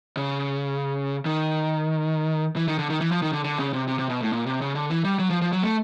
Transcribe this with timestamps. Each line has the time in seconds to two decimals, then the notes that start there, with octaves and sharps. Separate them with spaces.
0.17 C#3
1.25 D#3
2.56 E3
2.68 D#3
2.79 D3
2.90 D#3
3.01 E3
3.11 F3
3.22 D#3
3.33 D3
3.44 D3
3.58 C#3
3.73 C3
3.88 C3
3.99 C3
4.10 B2
4.21 A2
4.32 A#2
4.46 C3
4.61 C#3
4.75 D3
4.90 E3
5.04 G3
5.19 F#3
5.30 F3
5.42 F3
5.53 F#3
5.63 A3